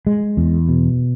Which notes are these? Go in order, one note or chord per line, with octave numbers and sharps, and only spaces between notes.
G#3
E2
B2